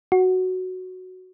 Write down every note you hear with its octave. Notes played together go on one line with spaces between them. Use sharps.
F#4